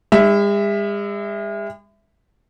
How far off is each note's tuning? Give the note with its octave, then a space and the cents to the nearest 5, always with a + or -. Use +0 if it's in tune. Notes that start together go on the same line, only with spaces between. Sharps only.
G#3 -45 E5 +0